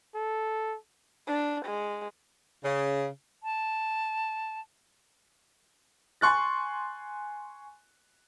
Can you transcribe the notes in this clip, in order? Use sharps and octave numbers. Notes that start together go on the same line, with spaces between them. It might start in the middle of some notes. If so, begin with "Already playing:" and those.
A4
D4
G#3
C#3
A5
G#5 C6 C#6 F#6 A6